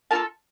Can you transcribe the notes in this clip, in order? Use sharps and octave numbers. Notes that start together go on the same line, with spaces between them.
A#3 F4 A4 F5 A5